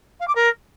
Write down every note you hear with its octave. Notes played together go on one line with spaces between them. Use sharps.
F5
D6
A#4